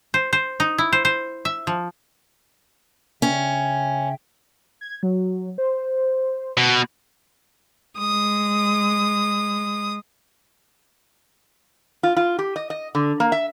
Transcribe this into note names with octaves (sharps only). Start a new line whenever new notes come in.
C5
C5
D#4
E4
C5
C5
E5
F3
C#3 C#4 E5 G5
G#6
F#3
C5
B2
G#3 D#6
F4
F4
G4
D#5
D#5
D3
A#3
E5